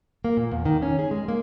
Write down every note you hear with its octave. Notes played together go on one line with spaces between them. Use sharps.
A#3
A#2
E2
D#3
C#4
G#4
G#3
A#3